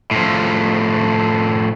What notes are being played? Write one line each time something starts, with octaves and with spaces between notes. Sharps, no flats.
A2 F3